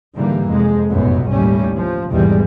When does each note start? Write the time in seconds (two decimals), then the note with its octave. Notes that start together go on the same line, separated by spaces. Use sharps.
0.15 G#2 D3 E3 G3 A#3
0.49 F2 C3 G#3
0.90 F1 B1 F#2 A2 F#3 B3
1.31 G1 D#2 A2 G3 C#4
1.77 F3
2.11 G#1 E2 B2 E3 G3 G#3